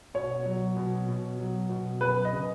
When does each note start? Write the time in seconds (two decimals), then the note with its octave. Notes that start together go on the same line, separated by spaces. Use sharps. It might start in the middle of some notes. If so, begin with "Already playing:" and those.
0.14 B2 C#5
0.46 F#3
0.77 B2
1.08 B2
1.39 F#3
1.69 B2
2.01 F#2 B4
2.25 D#5
2.32 C#3